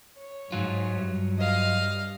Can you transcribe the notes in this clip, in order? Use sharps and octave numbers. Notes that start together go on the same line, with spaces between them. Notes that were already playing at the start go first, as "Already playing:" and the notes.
C#5
G#2 F#3 F4
G2
D#5 F5